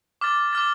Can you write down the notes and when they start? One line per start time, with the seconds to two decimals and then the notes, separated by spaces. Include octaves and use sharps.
0.21 D6 F6 A6
0.53 D6 F6 A6